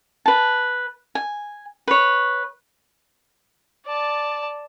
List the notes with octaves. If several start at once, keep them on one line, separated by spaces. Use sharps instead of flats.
B4 A5
G#5
B4 C#5
D5 A5